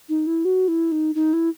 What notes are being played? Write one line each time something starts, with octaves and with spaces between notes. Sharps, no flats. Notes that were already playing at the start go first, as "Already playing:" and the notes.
D#4
E4
F#4
E4
D#4
D#4
E4